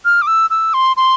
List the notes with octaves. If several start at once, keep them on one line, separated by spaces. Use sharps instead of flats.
F6
D6
E6
E6
C6
C6